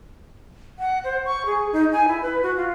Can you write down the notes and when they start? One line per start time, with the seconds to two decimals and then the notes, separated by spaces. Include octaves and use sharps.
0.79 F#5
1.04 C5
1.25 C#6
1.46 G#4
1.73 D#4
1.92 G#5
2.08 E4
2.22 B4
2.43 F#4
2.57 F4